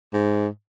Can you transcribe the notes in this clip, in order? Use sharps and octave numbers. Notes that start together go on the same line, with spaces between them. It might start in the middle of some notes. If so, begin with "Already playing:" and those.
G#2